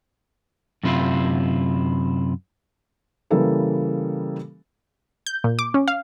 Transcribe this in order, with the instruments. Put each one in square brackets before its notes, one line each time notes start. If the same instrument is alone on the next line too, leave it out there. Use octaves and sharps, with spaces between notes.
[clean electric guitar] F#2 C3 E4 F4
[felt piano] C#3 E3 G3 A#3 A4 B4
[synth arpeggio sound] G6
A#2
D6
C#4
F5